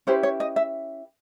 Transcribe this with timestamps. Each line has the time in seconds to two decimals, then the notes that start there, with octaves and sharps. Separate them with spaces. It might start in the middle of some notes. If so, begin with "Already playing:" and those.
0.07 C#4 E4 G4 B4 C5
0.23 C#5
0.40 D#5
0.56 E5